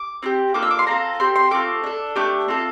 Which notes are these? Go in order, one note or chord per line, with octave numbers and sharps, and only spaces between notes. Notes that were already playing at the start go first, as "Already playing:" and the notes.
Already playing: D6
C4 E4 G4
A#3 D4 F4 A4 D6
E6
D6
C6
C4 F4 A4 A#5
C4 G4 C6
C6
A3 C4 F4 A4 D6
D4 A4
A3 D4 G4 D6
C4 F4 A4